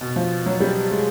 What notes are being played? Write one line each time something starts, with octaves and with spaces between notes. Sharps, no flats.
B2
F3
F#3
G3
G#3